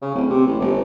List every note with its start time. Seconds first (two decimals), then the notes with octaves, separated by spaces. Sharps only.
0.02 C#3
0.15 D1
0.30 C3
0.46 A1
0.60 G1